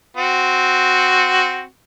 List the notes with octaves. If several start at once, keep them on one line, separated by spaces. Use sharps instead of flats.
C4 F#4